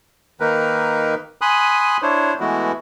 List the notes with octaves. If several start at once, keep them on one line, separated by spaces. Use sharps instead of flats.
D#3 A#3 D#4 A#4 B4
G#5 B5 C6 D#6 F#6
D4 E4 C5 C#5
E3 G#3 A3 B3 E4 F#4